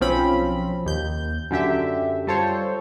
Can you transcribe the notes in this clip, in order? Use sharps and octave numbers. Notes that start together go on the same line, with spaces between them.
B1 F3 C4 C#4 B5
D#2 G6
F#2 D3 G4 E5
G3 F4 A4 C5 C#5